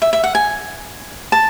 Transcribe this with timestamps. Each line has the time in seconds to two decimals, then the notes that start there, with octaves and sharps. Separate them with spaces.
0.02 E5
0.13 E5
0.24 F#5
0.35 G#5
1.32 A5